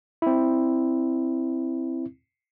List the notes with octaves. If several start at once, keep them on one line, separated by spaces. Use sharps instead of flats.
C4 E4